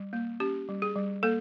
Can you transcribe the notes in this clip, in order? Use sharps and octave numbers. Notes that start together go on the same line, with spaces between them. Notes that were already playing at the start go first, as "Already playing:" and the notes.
Already playing: G3
A#3
C#4 G4
G3
G#4
G3
A#3 A4